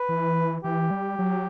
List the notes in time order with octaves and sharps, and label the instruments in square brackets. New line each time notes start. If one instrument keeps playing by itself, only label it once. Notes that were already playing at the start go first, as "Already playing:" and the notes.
Already playing: [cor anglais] B4
[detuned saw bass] E3
[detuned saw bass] E3 [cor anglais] G4
[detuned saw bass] G3
F#3